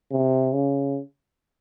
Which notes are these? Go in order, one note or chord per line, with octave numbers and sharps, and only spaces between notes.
C3
C#3